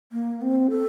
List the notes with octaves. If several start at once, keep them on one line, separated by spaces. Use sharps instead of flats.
A#3
C4
A4